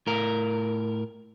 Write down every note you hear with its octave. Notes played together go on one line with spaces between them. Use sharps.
A2 A#4